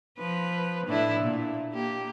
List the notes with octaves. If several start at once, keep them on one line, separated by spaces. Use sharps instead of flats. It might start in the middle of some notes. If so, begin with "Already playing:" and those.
F3 B4
A2 D4 E4
A#2
A#3 G4